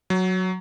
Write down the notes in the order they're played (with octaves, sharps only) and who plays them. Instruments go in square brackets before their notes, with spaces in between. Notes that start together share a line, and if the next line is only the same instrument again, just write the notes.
[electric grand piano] F#3